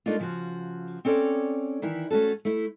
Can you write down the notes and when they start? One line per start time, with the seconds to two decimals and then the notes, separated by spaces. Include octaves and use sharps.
0.06 A3 A#3 D4 D#4 F4
0.19 C#3 F3 F#4
1.05 C4 C#4 A4 C#5 D5
1.82 D#3 E3 E4
2.10 A3 C#4 F#4 A4
2.45 A3 E4